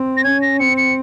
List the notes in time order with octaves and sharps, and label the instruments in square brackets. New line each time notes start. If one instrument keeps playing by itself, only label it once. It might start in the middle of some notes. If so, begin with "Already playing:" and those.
Already playing: [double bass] C4
[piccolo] A#6
[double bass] C#4 [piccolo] G#6
[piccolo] A#6
[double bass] C4 [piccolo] C#7
[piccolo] C#7